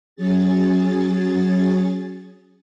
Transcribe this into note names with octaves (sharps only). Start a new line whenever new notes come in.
F#3 C#4 G#4 A6